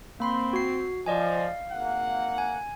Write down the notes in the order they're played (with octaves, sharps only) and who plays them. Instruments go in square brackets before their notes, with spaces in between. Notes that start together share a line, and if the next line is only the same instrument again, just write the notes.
[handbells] A#3 B5 C6 [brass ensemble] C4
[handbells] F#4 C7
[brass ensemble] F3 [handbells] D5 D#5 G#5
[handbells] F5
[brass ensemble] G#1 A#3 F#5
[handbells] G#5